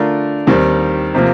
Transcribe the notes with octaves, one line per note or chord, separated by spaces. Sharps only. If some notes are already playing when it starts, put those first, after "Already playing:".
Already playing: D3 A3 D4 F4 A#4
D#2 D#3 G3 C4
C3 F3 A#3